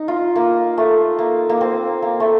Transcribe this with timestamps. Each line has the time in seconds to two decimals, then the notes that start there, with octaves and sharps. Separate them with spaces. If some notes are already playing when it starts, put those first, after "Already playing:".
Already playing: D#4
0.08 F4
0.36 A#3
0.78 A3
1.19 A#3
1.49 A#3
1.61 C4
2.02 A#3
2.20 A3